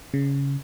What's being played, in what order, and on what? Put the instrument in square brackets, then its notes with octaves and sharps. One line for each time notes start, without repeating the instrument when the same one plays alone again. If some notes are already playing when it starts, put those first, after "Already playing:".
[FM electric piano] C#3